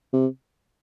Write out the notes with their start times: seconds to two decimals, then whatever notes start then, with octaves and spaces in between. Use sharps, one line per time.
0.13 C3